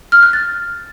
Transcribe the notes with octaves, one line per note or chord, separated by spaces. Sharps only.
F6
F#6
A6